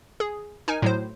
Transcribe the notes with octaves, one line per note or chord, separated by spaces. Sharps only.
G#4
D#4 A#4 G#5
A2 F#3 C5